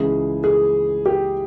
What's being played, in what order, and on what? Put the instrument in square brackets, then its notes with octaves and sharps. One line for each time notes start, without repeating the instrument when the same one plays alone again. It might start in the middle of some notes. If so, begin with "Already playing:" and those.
Already playing: [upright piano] C#2 C#3 E3 G#4
G#4
G4